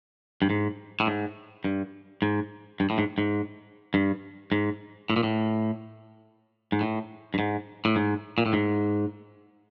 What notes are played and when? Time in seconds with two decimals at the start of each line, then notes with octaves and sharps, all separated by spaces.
0.42 G2
0.50 G#2
1.00 A2
1.07 G#2
1.64 G2
2.22 G#2
2.80 G2
2.90 A2
2.98 G#2
3.18 G#2
3.94 G2
4.52 G#2
5.10 A2
5.16 A#2
5.23 A2
6.72 G#2
6.81 A2
7.34 G2
7.39 G#2
7.85 A2
7.96 G#2
8.38 A#2
8.46 A2
8.53 G#2